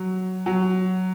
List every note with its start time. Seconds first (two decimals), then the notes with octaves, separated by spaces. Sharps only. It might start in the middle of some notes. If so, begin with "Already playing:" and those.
Already playing: F#3
0.46 F#3